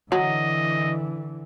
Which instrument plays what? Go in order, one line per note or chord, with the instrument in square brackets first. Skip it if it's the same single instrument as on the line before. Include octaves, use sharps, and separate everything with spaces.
[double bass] D3 E3 [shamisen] F#3 [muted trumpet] D#5